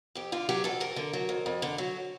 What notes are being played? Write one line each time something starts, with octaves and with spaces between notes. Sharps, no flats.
F2 G4
D3 F4
F#3 G4
F2 A4
F2 A#4
D3
F#3
F2
F2
D3
F#3